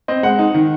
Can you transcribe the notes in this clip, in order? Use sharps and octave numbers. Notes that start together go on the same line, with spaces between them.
C4 D#5
G#3 F#5
D#4
D#3